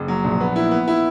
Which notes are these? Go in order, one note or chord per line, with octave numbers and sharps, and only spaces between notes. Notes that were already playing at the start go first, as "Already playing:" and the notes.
Already playing: F#1
F#3
A#1
B3
E4
B3
E4